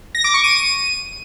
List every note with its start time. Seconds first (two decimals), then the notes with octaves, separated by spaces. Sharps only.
0.15 A#6
0.24 D6
0.34 C#6
0.44 D#7